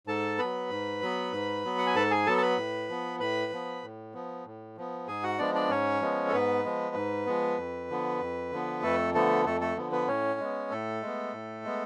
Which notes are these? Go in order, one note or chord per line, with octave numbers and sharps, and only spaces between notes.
G#2 A4 A5
F#3 B3 B4 B5
G#2
F#3 B3
G#2
F#3 B3
F#5
G#5
G#2 A4 A5
G#4 G#5
F#3 B3 A4 A5
A5
B4 B5
A2
F3 B3
A2 B4 B5
F3 B3
A2
F3 B3
A2
F3 B3
G#2 G#4 G#5
F#4 F#5
F3 G#3 B3 D4 D5
D4 D5
G#2 C#4 C#5
F3 G#3 B3
A4
G#2 B3 B4
F3 G#3 B3
G#2
F3 G#3 B3
F2
D3 F3 B3
F2
D3 F3 B3
F2 A3 A4
D3 F3 A3 B3 A4
F2 A3 A4
A3 A4
D3 F3 B3
B3 B4
A2 C#4 C#5
G#3 B3
A2 A3 A4
G#3 B3
A2
G#3 B3